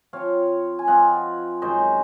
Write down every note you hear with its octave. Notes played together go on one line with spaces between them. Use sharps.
F3 C4 F4 C#5 F5
G#5
F3 C4 F4 D#5 F#5
F#2 D#3 G#3 C5 D#5